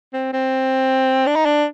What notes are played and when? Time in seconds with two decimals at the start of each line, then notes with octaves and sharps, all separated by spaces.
0.13 C4
0.33 C4
1.27 D4
1.36 D#4
1.45 D4